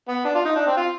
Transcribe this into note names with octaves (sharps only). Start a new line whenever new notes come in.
B3
D4
F4
D#4
D4
C4
F4